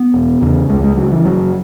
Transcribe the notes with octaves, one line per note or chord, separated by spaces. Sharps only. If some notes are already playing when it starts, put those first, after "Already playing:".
Already playing: B3
E1
E2 C#3
C#2 G#3
G#3
C#3 F#3
E3
F#1 F#3